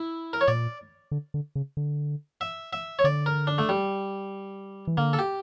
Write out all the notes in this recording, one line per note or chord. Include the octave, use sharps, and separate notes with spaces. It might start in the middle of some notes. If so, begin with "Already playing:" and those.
Already playing: E4
A#4
C#5
A#2 D5
D3
D3
C#3
D3
E5
E5
C#5
D3 D5
A#4
D4
A3
G3
E3
D3 A#3
A4
G4